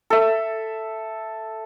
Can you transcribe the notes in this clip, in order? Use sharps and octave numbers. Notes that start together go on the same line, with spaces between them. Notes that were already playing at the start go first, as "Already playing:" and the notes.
A4 E5